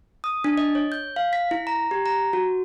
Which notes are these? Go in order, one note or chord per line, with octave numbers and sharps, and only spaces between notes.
D#6
D4
D#5
C#5
G6
F5
B6
E4
A#5
G4
A#5
F#4